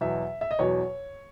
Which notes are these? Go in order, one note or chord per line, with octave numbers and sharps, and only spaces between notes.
E2 B2 F#3 E5
E5
D#5
E2 B2 F#3 C#5